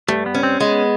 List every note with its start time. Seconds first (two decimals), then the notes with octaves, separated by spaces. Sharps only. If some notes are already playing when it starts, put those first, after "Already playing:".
0.08 G2 A3
0.26 B3
0.35 C#4
0.43 C4
0.60 G#3 B3